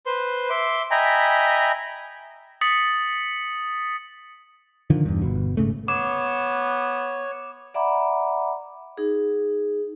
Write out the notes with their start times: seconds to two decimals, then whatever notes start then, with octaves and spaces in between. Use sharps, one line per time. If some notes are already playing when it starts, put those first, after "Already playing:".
0.06 B4 C5 C6
0.50 E5 C6 D6
0.91 D#5 E5 G5 G#5 A#5 B5
2.61 D#6 A6 B6 C#7 F#7
4.90 D3 D#3 F3
5.05 E2 G2
5.22 G1 B2
5.57 G#2 C#3 A3
5.88 B3 C#5 D6
7.74 D5 E5 F#5 A#5 B5 D6
8.97 D#4 G#4